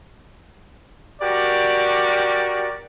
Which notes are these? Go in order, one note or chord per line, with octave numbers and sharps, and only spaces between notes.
F#4 G4 A#4 D5